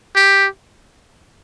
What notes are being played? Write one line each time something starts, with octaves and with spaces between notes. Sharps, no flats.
G4